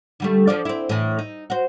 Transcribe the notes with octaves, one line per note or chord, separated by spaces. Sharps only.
D3 G3 A3
F3 F4 D5
C4 E4
A2 E3
D#4
F#4 C5